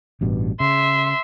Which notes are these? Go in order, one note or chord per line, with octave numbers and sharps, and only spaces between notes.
A1 G2 B2
C#3 E5 C6